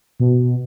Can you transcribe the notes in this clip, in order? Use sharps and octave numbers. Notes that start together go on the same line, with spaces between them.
B2